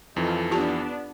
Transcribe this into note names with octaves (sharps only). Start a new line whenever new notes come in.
F2 E3 D#4 F4 A4
B3 D4 F4 G4 A5